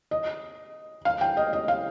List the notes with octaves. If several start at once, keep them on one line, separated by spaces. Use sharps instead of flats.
D#5
F5
G5
D#5
D#5
F5